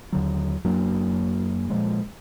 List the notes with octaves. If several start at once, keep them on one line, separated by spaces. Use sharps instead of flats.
D#2 D3 F#3
F#2 F#3 A#3 D4
A#2 F3 G#3